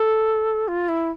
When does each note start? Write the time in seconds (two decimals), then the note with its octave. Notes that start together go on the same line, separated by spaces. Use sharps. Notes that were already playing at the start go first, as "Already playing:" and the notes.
Already playing: A4
0.67 F4
0.88 E4